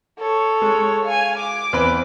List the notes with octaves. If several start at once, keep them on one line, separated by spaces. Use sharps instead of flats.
A4 C#5
G#3
F5 G#5
D6
E2 C4 B4